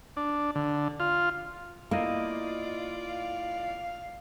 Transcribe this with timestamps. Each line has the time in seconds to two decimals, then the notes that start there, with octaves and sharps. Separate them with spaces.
0.17 D4
0.55 D3
1.00 F4
1.91 A#3 E4 F4 D5 D#5
3.06 F5